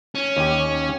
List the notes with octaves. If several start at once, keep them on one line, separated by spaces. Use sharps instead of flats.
C#4
D#2 G4